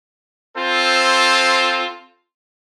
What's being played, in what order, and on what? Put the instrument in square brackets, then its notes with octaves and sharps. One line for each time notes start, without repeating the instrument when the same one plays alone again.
[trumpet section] C4 F4 A4 C5